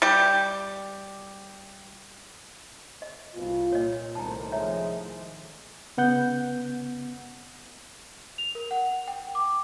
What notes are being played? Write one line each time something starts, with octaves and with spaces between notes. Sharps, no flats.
G3 G4
D#5
C2 F4
A#2 C#5 D#5
C2 A2 C3 D#3 A5 A#5
F3 G#3 C#5 E5 A#5
C#3 B3 F#5 G6
F7
A#4
F#5
G5
D6